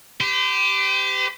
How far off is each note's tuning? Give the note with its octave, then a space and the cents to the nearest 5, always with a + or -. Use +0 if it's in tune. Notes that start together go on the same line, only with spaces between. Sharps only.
G4 +0 C5 -45